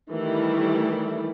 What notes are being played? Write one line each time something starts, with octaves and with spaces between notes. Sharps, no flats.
D#3 E3 G3 A3 E4